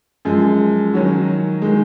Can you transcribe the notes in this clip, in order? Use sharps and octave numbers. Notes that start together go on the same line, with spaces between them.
F#2 F3 G#3
D#3 F#3 C#4 F#4
D#3 G#3